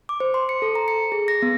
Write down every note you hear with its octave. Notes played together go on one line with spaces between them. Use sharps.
D6
C5
C6
C#7
A4
A#5
C#7
G#4
A#6
B3